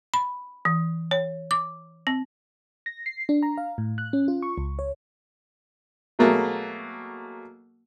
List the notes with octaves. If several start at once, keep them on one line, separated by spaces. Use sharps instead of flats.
B5
E3
C#5
D6
C4
A#6
C7
D4
A#5
F5
A2
F#6
C#4
F4
C#6
C#2
C#5
B2 F#3 A3 A#3 G#4